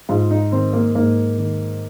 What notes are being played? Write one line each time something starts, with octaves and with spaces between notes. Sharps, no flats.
G#2 F4
D#4
D#3 C4
A#3
G#2 A#3
D#3